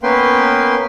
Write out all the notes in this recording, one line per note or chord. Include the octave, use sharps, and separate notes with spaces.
A#3 B3 C#4 B4 G5 C6